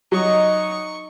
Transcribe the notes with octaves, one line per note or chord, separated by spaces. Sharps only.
F#3 D#4 D#5 C#6